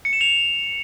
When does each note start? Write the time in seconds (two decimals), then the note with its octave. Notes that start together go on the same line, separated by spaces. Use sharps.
0.05 C#7
0.13 E7
0.21 F7